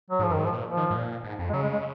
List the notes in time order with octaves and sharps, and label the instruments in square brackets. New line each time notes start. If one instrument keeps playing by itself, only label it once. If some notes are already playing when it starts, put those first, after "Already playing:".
[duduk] F#3
[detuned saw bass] G#2
[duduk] F3
[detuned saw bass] F#2
[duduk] D#3
[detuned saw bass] G#2
[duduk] F3
[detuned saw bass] A#2
[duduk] F3
[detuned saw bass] D#3
G#2
A#2
G#2
F2
[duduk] G#3
[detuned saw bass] C#3 [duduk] F#3
[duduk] G#3
G#3